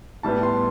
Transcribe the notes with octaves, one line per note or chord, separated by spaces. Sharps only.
A2 G3 B3 A5
C6